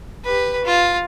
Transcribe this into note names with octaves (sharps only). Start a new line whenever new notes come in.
G4 B4
F4